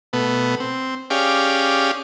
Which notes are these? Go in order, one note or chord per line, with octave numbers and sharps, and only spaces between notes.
B2 A3 B3
C4
C#4 G4 G#4 D5 F5